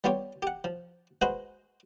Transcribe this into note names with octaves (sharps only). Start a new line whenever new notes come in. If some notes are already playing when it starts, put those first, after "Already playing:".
G3 B3 F4 G4 C#5
G4 F#5
F3
G#3 F#4 G#4 B4 C5 F#5